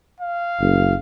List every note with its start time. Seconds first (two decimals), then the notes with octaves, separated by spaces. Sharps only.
0.20 F5
0.60 F#1